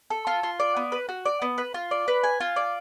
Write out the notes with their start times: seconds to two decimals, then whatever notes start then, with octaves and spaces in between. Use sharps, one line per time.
0.10 A4
0.27 F4
0.43 F4
0.60 D5
0.76 B3
0.92 B4
1.09 F#4
1.26 D5
1.42 B3
1.58 B4
1.74 F4
1.91 D5
2.08 B4
2.24 G#5
2.40 F4
2.56 D5